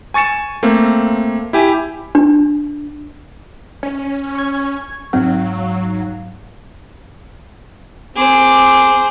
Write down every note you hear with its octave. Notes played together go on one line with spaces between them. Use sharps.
G#5 C#6 A6 C#7 E7
A3 A#3 C4
E4 G4 G#5
D4
C#4
C#6 G#6
G#2 F#3 C4 D#4 F5
C4 G#4 C5 D6